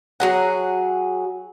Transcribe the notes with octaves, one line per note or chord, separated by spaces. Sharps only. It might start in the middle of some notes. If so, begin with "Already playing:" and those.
F#3 G#4 F#5